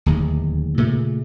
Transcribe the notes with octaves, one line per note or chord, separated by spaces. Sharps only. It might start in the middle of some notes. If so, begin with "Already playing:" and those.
D1 D#2
A#2 C#3 A3